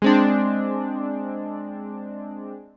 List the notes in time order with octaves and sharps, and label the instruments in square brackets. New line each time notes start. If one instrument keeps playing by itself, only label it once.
[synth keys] G#3 C4 D4